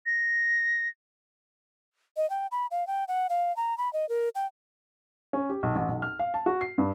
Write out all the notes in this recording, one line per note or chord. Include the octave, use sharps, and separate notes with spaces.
A#6
D#5
G5
B5
F5
G5
F#5
F5
A#5
B5
D#5
A#4
G5
C#4
G4
B1
A1
B1
F6
F5
A5
F#4
C7
G2